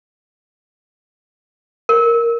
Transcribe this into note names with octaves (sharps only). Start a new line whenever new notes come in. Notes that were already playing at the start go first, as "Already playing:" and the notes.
A#4